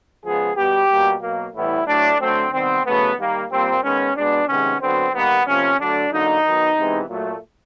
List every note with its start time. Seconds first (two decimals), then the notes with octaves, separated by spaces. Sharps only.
0.24 C#3 F3 G#3 B3 G#4
0.56 B2 G3 B3 G4
0.90 B2 G3 A#3
1.22 B2 F#3 A#3
1.55 A2 E3 G3 B3 E4
1.87 A2 F#3 A3 D4
2.19 D3 F#3 A3 C4
2.52 C3 D#3 G3 B3 C4
2.85 C#3 F#3 A3 B3
3.18 D#3 G3 A#3
3.51 A#2 G3 A#3 C4
3.83 D#3 G#3 B3 C#4
4.16 B2 G#3 B3 D4
4.48 C3 D#3 G#3 B3 C#4
4.81 D3 F#3 B3 C4
5.13 D#3 G3 A#3 B3
5.47 C3 F3 A#3 C#4
5.79 D3 F#3 A3 D4
6.12 D3 F#3 A#3 D#4
6.44 D#3 F#3 B3
6.77 C3 E3 G#3 B3
7.09 A#2 F#3 A3